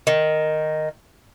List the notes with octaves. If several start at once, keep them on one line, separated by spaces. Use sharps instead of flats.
D#3